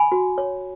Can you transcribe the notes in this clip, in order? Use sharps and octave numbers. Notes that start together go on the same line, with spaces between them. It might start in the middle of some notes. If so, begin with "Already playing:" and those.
Already playing: G#5 B5
F#4
C#5